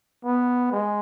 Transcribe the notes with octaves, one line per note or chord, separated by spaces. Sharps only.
B3
G#3